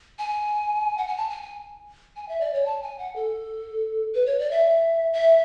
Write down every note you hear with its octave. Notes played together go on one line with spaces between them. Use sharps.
G#5
F#5
G#5
A5
G#5
G#5
G#5
E5
D5
C#5
A5
G#5
F#5
A4
B4
C#5
D5
E5
E5